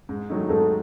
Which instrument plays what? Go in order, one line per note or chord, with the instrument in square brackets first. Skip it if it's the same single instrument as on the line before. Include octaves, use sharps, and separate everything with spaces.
[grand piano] G#2
D#3 F#3 A3 D#4
[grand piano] G#2 [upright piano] A4